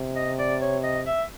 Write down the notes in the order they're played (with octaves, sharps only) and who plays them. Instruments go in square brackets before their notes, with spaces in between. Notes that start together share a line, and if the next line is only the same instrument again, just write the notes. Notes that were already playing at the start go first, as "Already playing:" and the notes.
Already playing: [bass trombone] C3
[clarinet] D#5
D5
C#5
D#5
E5